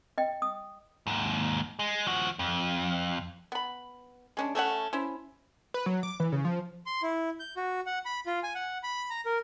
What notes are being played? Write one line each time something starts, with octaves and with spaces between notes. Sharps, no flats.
D#5 G5
D#6
D#2 G#2
G#3
F3 F#4
F2
B3 B5
G#3 C#4 D4
A3 C#4 E5 F#5
C#4 E4 C5
B4
F#3
D6
E3
C#3
F3
C6
E4
G6
F#4
F#5
B5
F4
G#5
F#5
B5
A#5
A#4